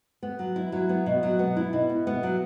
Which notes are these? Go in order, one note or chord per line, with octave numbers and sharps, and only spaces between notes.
B3
F#3
E4
F#3
B3
B2
F#3
B3
E4
B2
B3
B3
F#3